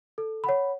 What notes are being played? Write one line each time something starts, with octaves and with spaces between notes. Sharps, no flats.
A4
C#5 F#5 B5